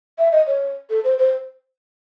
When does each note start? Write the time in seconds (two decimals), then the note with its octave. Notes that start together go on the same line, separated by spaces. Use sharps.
0.18 E5
0.32 D#5
0.47 C#5
0.90 A4
1.04 C5
1.19 C5